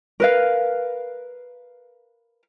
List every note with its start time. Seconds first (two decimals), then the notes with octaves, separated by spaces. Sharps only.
0.20 A#4 B4 F5